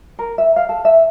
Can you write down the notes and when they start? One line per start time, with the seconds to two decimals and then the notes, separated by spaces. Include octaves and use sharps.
0.19 A#4
0.38 E5
0.56 F5
0.69 A4
0.85 E5